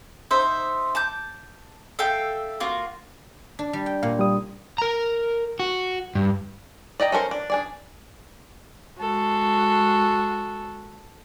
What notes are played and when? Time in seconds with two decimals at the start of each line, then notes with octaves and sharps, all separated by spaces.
0.31 D#4 C5 E5
0.95 A5 D6 G6
1.99 A4 E5 F5 G5
2.60 A#3 F4 F#4
3.59 D4
3.73 G3
3.86 G5
4.03 A#2 F5
4.19 G3 D#6
4.78 A#4 A#5
5.60 F#4
6.15 G2
7.00 D5 D#5 G5 A#5
7.12 C#4 A4 A#4 C5
7.31 D4
7.50 D4 G#4 D5
9.00 G#3 F#4 A4